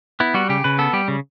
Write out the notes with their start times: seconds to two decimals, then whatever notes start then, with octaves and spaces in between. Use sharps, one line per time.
0.20 B3 E4
0.34 G3 F#4
0.49 C#3 G4
0.64 C#3 B4
0.79 B3 A4
0.93 G3 G4
1.08 C#3